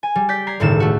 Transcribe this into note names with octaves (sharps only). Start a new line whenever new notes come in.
G#5
G3
D5 G6 B6
A#5 G#6 C7
G1 C#2 A2 D#3 G3 E7
A3 F#4